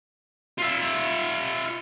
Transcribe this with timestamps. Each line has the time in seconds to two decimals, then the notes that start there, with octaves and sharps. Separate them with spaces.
0.58 F4 E5